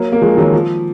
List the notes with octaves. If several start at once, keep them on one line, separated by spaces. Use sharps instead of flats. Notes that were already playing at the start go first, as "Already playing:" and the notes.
Already playing: F#3 A#3
A#3
F3 G#3
D#3 F#3
F3